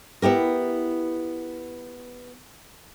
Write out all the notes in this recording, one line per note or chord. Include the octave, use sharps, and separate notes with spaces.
B3 E4 G4 A#4